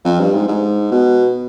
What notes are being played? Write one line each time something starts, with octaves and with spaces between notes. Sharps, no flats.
F2
G2
G#2
G#2
B2